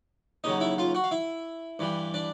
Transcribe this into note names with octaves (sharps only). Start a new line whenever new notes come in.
D#2 C#3 F#3 D#4 D#5
E4 E5
F4 F5
F#4 F#5
F5
E4 E5
G2 E3 G3
D4 D5